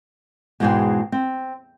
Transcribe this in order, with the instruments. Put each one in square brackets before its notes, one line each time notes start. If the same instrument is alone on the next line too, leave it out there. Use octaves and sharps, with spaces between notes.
[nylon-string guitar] E2 G#2 B2 G#3 C5 G5
C4